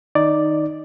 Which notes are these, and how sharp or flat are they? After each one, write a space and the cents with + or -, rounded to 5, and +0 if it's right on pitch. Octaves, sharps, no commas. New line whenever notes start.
D#3 +0 D#4 +0 D5 +0